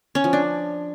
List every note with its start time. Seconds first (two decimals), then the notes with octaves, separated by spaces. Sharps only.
0.15 C#4
0.24 F3
0.33 D4